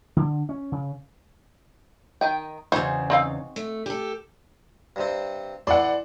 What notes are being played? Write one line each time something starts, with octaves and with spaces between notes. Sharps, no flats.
D3
C#4
C#3
D#3 D#5 G5
E2 C#3 D#4 F#4 G#4 C5
C4 D#4 F5
A3
G4 A4
G2 C3 C4
E3 A4 D5 F#5 C6